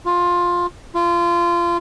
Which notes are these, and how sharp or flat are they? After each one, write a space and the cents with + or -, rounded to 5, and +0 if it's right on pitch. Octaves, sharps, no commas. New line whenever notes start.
F4 +10
F4 -25